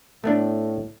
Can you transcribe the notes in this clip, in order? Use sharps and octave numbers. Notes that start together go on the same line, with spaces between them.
A2 A3 B3 D4